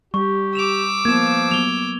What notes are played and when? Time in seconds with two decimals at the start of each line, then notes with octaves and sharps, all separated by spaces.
0.14 G3 G4 C#6
0.55 D6 E6 E7 F7
1.05 F3 A#3 B3 G#6 E7
1.51 F#3 B3 F7 G7